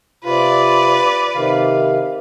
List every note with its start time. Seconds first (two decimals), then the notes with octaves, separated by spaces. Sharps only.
0.25 C3 F4 B4 D5
1.35 C3 D#3 F5